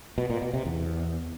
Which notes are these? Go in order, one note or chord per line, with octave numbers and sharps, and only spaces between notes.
B2
A#2
B2
C3
E2